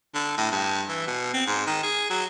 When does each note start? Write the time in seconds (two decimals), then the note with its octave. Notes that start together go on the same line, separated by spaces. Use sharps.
0.14 D3
0.38 A2
0.52 G2
0.89 E3
1.08 B2
1.34 C4
1.47 G#2
1.67 D#3
1.83 G#4
2.10 F#3